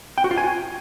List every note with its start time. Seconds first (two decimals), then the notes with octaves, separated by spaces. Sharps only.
0.18 G5
0.24 F#4
0.31 F4
0.37 G#5